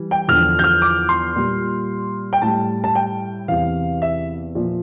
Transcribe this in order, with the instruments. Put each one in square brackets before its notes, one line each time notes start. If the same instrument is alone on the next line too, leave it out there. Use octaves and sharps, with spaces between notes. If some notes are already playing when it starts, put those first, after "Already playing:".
Already playing: [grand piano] E3 G3
G5
E2 D3 F3 F6
G6
F6
D6
C6
A#2 G3
G5
A2 G3 A5
A5
G5
E2 C3 E3 F5
E5
A#2 F3